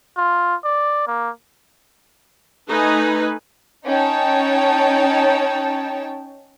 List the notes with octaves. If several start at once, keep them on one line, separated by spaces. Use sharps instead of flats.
F4
D5
A#3
A3 D#4 B4 G#5
C#4 D#4 C#5 G5 A5